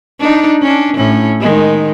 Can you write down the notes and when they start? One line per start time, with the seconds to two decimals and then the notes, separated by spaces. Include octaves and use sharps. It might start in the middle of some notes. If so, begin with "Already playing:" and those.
0.20 D4 D#4
0.62 C#4 D4
0.96 A2 C#4
1.40 D#3 G#3